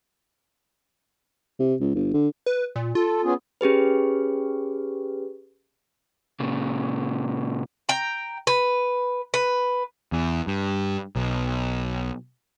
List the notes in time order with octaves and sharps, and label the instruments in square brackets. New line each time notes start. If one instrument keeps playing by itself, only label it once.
[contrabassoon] C3
C#2
G1
D3
[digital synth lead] B4
A#2
[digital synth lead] F4 [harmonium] A4
[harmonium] B3 C#4 G#4
[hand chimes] C#4 G4 G#4 B4
[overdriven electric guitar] A#2 C#3
[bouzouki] G5 A#5
B4
B4
[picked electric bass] E2
G2
B1